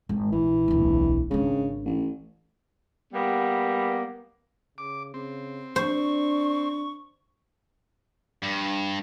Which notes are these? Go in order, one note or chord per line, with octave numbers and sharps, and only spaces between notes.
G#1
A#1 E3
D1 B1
G#1 C#3 D4
A1
G3 A#3 B3
C#3 D6
C#3 C4
D4 C5 C#6
G2